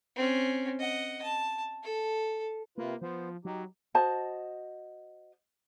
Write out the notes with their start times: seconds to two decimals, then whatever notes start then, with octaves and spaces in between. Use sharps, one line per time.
0.16 C4 C#4
0.79 D#5 F#5
1.22 A5
1.83 A4
2.78 C3 A#3 F4 B4
3.02 F3 B3 C5
3.45 F#3 D#4 G4
3.94 F#4 C5 D#5 A5